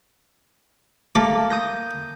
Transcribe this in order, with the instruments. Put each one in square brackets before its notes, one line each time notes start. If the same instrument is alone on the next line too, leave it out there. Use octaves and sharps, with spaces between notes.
[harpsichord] A3 A4 D6 [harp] A#3
[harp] D#6 G6 A#6